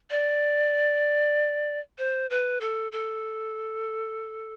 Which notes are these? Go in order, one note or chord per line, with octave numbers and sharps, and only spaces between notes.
D5
C5
B4
A4
A4